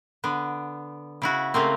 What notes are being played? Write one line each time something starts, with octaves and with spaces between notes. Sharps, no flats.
D3 B3
C#3 E4 F#4
C#3 A3 A#3 C4